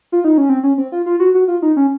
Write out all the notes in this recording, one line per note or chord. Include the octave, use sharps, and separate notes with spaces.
F4
D#4
C#4
C4
C#4
C4
F4
F4
F#4
F#4
F4
D#4
C#4